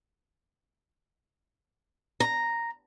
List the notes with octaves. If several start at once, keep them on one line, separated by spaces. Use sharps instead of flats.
A#5